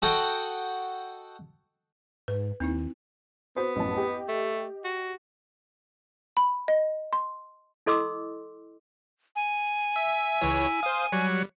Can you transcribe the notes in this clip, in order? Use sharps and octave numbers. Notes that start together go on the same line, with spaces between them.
F#4 A4 D#5 F#5 G5
G#2 B4
D#2 C4 D#4 E4
B3 F#4 C5
A1 F#2 A5
G4 D#5
A3
F#4
B5
D#5
C6
E4 A4 D#5 C6 D6 E6
G#5
E5
C#2 E3 E4 C#5
C5 F5 D#6
F#3 G3 C#5